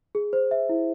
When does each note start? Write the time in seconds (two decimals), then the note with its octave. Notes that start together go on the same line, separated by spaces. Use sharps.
0.15 G#4
0.33 C5
0.51 E5
0.69 E4